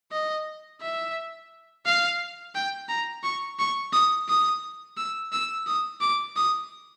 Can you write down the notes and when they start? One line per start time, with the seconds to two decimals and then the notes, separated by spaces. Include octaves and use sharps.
0.12 D#5
0.81 E5
1.86 F5
2.55 G5
2.89 A#5
3.24 C#6
3.59 C#6
3.93 D#6
4.29 D#6
4.97 E6
5.32 E6
5.67 D#6
6.01 D6
6.36 D#6